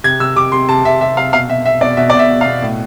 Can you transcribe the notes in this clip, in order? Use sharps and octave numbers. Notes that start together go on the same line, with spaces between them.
C3 G#6
C3 E6
C3 D6
C3 C6
C3 A5
C3 E5
C3 E5
C3 F5
B2 F5
B2 E5
B2 E5
B2 D5
B2 E5
B2 D5
E5
B2
F5
B2
A2